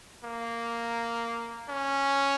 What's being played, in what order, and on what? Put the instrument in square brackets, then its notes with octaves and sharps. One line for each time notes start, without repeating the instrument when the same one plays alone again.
[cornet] A#3
C#4